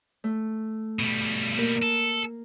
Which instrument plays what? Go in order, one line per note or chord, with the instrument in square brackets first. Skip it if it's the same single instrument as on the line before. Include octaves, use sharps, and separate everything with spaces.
[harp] A3
[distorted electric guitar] B2 G3
[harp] A#3 A#4
[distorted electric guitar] A4